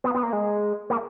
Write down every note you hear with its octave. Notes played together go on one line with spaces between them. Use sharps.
B3
B3
A#3
G#3
A#3